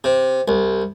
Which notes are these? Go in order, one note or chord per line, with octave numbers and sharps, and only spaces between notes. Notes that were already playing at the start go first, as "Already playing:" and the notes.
C3
C2